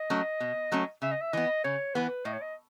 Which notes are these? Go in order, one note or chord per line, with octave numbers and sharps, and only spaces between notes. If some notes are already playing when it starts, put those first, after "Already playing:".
Already playing: D#5
F#3 A3 C#4
B2
F#3 A3 C#4
C#3 E5
D#5
E5
E3 B3 D#5
C#3 C#5
E3 B3 B4
A2 D#5
C#5
D#5